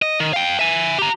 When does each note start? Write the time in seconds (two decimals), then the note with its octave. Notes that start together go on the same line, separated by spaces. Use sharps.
0.02 D#5
0.20 D#3
0.33 F5 G5
0.59 E5 G#5
0.98 G4 A#5